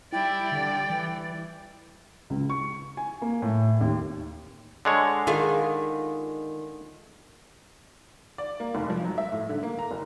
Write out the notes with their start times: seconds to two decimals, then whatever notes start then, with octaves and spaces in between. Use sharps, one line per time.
0.13 G3 E4 D5 G5
0.52 D3
0.90 E3
2.30 C#2
2.49 C#6
2.97 G#5
3.22 A#3
3.42 A2
3.81 D#2
4.85 D3 G#3 C#5
5.27 D#3 F4 G#4
8.38 D5
8.60 A#3
8.75 F1
8.90 F3
9.04 F#3
9.18 E5
9.32 A2
9.49 D3
9.63 A#3
9.79 A#5
9.91 F#1